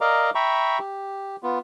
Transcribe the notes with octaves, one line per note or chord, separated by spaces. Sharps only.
A#4 D5 D#5 F5 A#5 D6
E5 G5 A#5 B5 C#6
G4
B3 F4